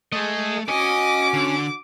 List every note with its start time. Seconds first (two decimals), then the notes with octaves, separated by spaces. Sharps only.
0.12 A3 G#4 D#5
0.69 C#4 F#4 D#5 G#5 D6
1.34 D3